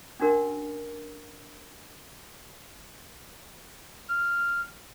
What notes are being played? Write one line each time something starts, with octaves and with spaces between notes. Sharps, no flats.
C#4 D4 F#4 A#4
F6